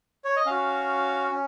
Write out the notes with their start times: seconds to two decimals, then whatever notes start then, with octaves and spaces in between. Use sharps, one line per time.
0.25 C#5
0.36 D#5
0.46 C#4 F#4 F5
1.31 C#4